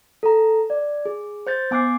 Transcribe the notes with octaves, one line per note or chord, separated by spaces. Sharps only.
A4 A#5
D5
G#4
C5 G6 A6
B3 G#5 D6 F#6 C7